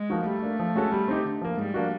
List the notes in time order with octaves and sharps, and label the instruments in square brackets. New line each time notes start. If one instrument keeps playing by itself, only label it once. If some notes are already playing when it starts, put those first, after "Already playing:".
Already playing: [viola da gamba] G#3
[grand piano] F3 A#3 D#4 F#4
[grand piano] G3 [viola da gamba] A3
[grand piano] A#3 D4
F3
G#3 C#4 F#4 A4
G3
C4 D#4 G4
D3
F3 A#3
[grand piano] G#2 [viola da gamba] G3
[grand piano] F3 A#3 D4 F#4